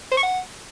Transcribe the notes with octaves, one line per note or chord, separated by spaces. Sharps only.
C5
C#6
F#5